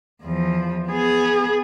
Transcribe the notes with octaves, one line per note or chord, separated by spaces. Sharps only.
E2 F3
B3 G#4